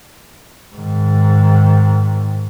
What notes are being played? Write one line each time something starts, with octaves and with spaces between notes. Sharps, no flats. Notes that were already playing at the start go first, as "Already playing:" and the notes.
G#2 D#3